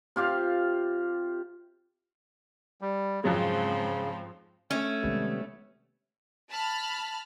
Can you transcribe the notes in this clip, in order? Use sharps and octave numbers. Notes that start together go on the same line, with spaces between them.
C3 F4 G4 F5
G3
F2 G#2 C#3 F3 F#3 G#3 C4
A3 C#4
C3 D#3 G3 G#3 B3
A5 B5 F6